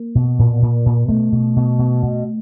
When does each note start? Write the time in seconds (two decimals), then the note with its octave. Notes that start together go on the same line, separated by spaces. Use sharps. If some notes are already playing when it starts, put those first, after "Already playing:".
Already playing: A#3
0.15 B2
0.39 A#2
0.62 A#2
0.86 A#2
1.09 B2 A3
1.32 B2
1.56 B2
1.79 B2
2.03 B2